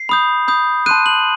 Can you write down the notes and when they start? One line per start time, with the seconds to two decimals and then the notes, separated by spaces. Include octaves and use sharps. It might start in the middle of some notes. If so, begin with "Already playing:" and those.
Already playing: C7
0.09 B5 D#6 G6
0.48 B5 D#6 G6
0.86 A5 C6 F#6 D#7
1.06 F#7